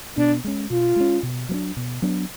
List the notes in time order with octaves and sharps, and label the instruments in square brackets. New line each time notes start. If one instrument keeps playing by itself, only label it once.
[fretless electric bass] B2 [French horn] D4
[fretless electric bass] G#3 C#4
[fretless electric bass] B2 [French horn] F4
[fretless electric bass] G#3 C#4
B2
F#3 B3 D4
B2
F#3 B3 D4